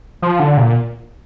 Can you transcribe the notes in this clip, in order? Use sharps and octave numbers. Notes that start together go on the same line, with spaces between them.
F3
D3
A#2